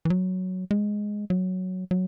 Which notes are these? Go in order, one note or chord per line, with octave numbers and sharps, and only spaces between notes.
E3
F#3
G#3
F#3
F#3